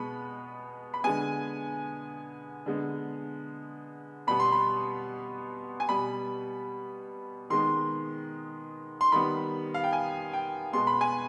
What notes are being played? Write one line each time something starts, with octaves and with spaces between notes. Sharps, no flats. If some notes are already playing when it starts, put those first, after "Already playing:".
Already playing: B2 G#3 B3 B5
B5
D3 G#3 B3 G#5
D3 G#3 B3
B2 G3 B3 B5
C6
B5
G#5
B2 G3 B3 B5
D#3 G#3 B3 C6
C6
D#3 G3 B3 B5
F5
G5
G#5
G5
B2 G#3 B3 C6
B5
G#5